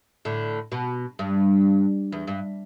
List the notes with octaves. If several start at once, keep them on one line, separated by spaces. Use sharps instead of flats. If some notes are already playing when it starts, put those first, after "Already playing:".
A2 D3
B2
G2
E2
G2